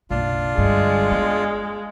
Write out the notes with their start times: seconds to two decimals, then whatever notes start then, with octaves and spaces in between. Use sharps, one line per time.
0.10 F#1 B1 D4 F4
0.58 G2 D3 G#3
1.11 B3